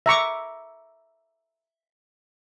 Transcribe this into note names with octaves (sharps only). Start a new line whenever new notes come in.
E5 A#5 C#6 D6